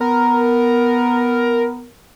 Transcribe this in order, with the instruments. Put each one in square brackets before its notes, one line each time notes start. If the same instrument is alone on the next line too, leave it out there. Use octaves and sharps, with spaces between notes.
[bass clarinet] B3 [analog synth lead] A#4